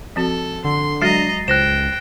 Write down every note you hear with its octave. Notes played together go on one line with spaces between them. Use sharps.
F3 C4 F#4 A4
D3 C6
F#3 G#3 F#4 D#5 A#5 A6 C7
C#2 C5 G5 F#6 A#6 E7